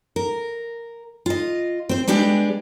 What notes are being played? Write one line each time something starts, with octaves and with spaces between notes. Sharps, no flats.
A#4
F4 D#5
C4 C5
G3 G#3 B3 D4 G4 G#4